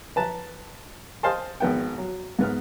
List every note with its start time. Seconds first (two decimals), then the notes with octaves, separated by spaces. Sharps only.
0.16 B4 A5 A#5
1.23 C5 D#5 F5 G#5 A5 C6
1.60 G#1 B3 G5
1.98 F#3
2.39 G#2 B3 F6